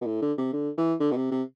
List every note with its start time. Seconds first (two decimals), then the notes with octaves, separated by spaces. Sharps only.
0.01 B2
0.07 A2
0.22 D3
0.38 C3
0.53 D3
0.78 E3
1.00 D3
1.12 B2
1.16 C3
1.32 C3